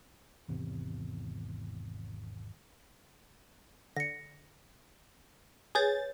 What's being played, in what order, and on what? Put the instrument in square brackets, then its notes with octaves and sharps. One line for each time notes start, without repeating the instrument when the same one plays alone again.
[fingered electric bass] G#1 E2 C3
[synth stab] D3 [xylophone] A#6 C#7
[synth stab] G#4 A6 [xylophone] B4 C#5 G6